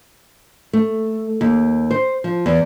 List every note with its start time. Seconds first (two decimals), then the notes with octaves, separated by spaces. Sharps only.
0.73 A3
1.41 D#2
1.91 C5
2.24 F3
2.46 E2